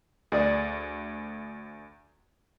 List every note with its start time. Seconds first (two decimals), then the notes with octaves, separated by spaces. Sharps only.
0.32 D2 G#4 D5 D#6